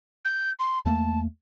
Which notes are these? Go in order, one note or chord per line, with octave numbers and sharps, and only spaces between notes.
G6
C6
E2 A3 A#3 A5